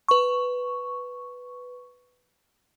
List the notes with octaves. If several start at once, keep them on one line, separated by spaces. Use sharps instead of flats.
B4 C#6